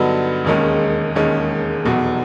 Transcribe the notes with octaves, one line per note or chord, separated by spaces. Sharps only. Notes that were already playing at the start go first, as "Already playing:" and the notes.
Already playing: G2 D3 F#3 B3 D#4
E1 D#2 D#3 G#3 C#4
E1 D#2 D#3 G#3 C#4
F1 E2 B2 F#3